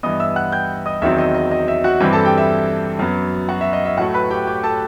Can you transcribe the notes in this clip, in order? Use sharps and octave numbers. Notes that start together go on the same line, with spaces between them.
G2 E3 B3 D#5 D#6
E5 E6
F#5 F#6
G5 G6
D#5 D#6
E2 D#3 F#3 C4 E5
D#5
D#5
D#5
E5
F#4 F#5
G2 E3 G3 C4 G4 G5
A4 A5
G4 G5
E5
F#2 F#3 B3
F#4 F#5
E5
D#5
E5
A2 F#3 A3 F#4 F#5
B4 B5
G4 G5
G4 G5
A4 A5